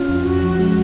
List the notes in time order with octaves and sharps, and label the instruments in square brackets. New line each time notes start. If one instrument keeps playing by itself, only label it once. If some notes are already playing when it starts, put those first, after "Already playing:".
Already playing: [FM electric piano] C#4 [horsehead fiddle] F4
[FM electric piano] F2
[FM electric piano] F2 [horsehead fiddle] F#4
[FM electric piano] F3
G#3